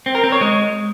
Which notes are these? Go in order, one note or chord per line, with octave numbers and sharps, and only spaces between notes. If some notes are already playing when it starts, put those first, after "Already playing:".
C4
A#4
C4
C#5
G#3